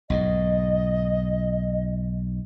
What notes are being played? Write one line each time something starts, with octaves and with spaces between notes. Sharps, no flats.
B1 G#2 D#5